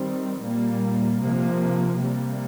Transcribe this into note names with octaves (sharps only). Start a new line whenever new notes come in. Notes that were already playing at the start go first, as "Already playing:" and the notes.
Already playing: D#3 G3 C4
A#2 G3 A#3
C3 F3 A#3
C3 G3 A#3